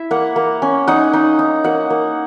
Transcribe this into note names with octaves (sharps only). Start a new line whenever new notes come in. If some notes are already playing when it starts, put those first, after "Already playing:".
Already playing: E4 E5
A#3 F#5
A#3
C#4
D#4 F#5
D#4
D#4
A#3 F#5
A#3